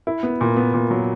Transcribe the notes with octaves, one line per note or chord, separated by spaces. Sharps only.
E4
B3
A#2
B3
A#2
F#3